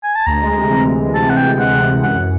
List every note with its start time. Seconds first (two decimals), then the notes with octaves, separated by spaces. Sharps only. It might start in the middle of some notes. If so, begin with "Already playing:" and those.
0.04 G#5
0.15 A5
0.26 D2 A#5
0.41 G#3
0.56 C3
0.70 E3
0.85 D2
1.01 G#3
1.14 C3 A5
1.29 E3 F#5
1.37 G5
1.44 D2
1.59 G#3 F#5
1.73 C3
1.88 E3
2.03 F#2 F#5